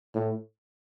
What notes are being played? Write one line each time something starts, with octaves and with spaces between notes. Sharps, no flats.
A2